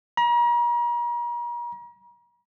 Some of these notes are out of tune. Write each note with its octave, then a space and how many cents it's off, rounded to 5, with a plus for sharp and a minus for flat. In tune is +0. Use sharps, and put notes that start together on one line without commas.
A#5 +40